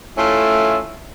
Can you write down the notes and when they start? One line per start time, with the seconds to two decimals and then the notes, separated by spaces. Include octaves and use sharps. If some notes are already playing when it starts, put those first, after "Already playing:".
0.17 A3 C#4 E4 F4 A4